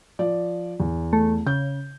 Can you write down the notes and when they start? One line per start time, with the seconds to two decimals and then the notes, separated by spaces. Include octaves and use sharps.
0.19 F3 D5
0.80 E2
1.13 A3
1.47 C#3 G6